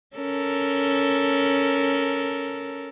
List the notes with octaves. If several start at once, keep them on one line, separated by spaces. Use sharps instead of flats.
C#4 A4 A#4